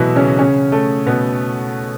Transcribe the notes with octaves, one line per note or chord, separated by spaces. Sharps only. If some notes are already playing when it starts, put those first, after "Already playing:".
Already playing: B2 E3 F#3 A3 B3 E4 F#4
C#3 C#4
C#3 C#4
A3
B2 B3